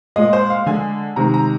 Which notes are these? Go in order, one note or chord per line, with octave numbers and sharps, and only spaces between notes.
A#2 G#3 D#5
C5
F5
D3 G#3 G#5
C3 D#3 G#3 A#5
A#5